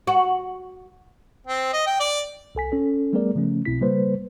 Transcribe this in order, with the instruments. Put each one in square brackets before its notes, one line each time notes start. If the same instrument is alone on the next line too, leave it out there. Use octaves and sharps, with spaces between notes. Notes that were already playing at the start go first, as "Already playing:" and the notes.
[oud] F#4
[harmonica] C4
D#5
G5
D5
[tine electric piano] C2 A4 G#5 B6
C#4 A4
G3 A3 B3 G#4 A#4 D5
C#3 F3 A3 C#4
B1 B2 C4 E4 B6
C#3 G3 A#3 B4 C5